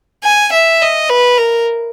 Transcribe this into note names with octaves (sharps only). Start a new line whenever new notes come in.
G#5
E5
D#5
B4
A#4